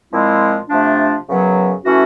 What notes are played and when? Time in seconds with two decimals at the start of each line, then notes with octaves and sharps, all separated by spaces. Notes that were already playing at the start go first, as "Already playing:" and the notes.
0.12 A#2 F3 G#3 C4 E4
0.69 C3 F3 A3 D4
1.27 F#2 C#3 F#3 B3
1.84 E3 A3 C#4 F#4